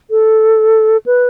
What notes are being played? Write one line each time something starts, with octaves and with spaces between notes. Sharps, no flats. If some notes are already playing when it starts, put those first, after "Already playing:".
A4
B4